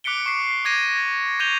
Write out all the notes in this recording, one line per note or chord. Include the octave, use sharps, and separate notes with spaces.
D6 F#6 B6 C#7 D7 G7
C#6 C7
D6 G#6 A#6 D#7
C#6 G6 D#7 F7 G7